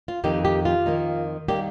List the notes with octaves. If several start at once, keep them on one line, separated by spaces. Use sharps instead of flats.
F4
F2 D#3 A#3 D#4 G4
G4
F4
F2 D#3 A#3 D#4
D#3 G3 A#3 G4